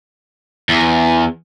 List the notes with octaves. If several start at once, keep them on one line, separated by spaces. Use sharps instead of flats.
E2